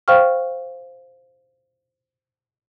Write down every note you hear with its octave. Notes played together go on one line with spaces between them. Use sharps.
C5 F5 G5 C#6 F6